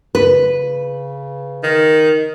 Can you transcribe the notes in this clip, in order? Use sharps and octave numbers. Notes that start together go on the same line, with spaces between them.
C#3 B4
D#3